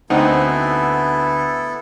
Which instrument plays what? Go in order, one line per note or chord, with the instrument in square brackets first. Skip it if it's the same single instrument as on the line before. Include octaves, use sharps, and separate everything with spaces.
[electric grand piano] D2 F#5 [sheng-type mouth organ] B3 E4 A4 [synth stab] C4 D#4